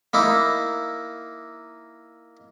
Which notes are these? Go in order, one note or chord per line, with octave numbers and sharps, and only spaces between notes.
A#3 D#4 E4